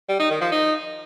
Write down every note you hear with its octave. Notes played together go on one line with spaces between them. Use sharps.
G3
D#4
D#3
F3
D#4